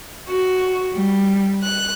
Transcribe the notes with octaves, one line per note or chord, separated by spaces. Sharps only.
F#4
G3
F#6